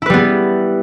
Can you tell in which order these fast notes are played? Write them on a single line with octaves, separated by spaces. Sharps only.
E4 B4 G3 B3